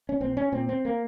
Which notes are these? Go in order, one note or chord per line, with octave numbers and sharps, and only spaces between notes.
C#4
A#1 C4
C#4
A#2 C4
C4
A#3